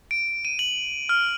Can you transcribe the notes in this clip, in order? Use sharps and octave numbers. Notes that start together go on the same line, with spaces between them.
D7
D#7
F#7
F6